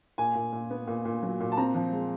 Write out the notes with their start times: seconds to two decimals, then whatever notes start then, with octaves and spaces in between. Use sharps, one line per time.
0.18 A#2 G#5
0.35 A#2
0.53 A#2
0.70 B3
0.87 A#2
1.05 A#2
1.23 F#3
1.40 A#2
1.52 A5
1.57 C4 A#5
1.75 F3
1.92 G#3